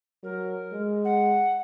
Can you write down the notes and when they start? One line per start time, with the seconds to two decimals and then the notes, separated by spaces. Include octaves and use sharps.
0.23 F#3 A#4
0.72 G#3
1.04 F#5